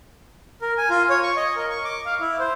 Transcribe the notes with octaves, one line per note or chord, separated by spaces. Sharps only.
A#4
G#5
F4
C#5
C#6
D#5
A#4
C#6
D6
F5
E4
C5